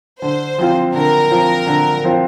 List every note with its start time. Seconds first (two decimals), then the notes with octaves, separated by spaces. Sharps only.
0.22 D3 C5
0.58 F3 C4 F4
0.94 D3 A#4
1.31 F3 C4 F4
1.67 D3
2.04 F3 C4 F4